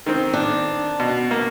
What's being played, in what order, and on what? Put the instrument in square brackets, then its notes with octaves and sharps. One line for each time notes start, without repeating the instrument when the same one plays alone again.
[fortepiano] D#3 C4
[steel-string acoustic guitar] D4
[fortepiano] B2
A#3